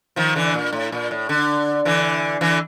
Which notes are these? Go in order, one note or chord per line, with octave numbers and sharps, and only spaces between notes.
D#3 F3
D3 E3
A#2
A2
A#2
A2
D3
D3 E3
D3 E3